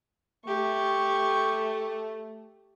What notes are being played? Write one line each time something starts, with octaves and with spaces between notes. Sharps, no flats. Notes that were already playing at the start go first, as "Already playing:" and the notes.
A3 G4 C#6